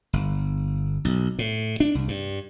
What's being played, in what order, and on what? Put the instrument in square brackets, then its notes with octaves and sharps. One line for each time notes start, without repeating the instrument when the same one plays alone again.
[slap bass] G1
B1
A2
D4
C2
G2